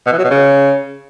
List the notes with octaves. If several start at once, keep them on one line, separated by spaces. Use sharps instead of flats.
B2
E3
F#3
B2
C#3